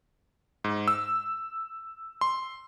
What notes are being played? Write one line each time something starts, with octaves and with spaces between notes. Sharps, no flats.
G#2
E6
C6